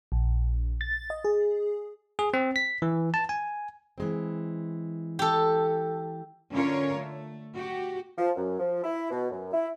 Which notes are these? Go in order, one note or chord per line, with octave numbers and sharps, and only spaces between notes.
A#1
A6
D#5
G#4
G#4
C4
B6
E3
A5
G#5
E3 G#3 C4
G4 A4
D3 C#4 F4 A#4 C#5
A3
F#4 G4
F3
F#2
F3
E4
B2
F#2
E4